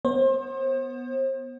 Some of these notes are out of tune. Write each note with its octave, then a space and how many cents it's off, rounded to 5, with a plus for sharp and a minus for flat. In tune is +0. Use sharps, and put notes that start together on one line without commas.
B3 +0 C5 +35